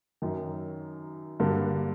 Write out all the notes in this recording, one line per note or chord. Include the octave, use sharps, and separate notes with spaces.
F#2 D#3 F#3
G2 D3 F#3 A#3